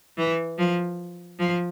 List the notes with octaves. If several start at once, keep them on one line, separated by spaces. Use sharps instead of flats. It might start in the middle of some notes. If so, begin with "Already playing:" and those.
E3
F3
F3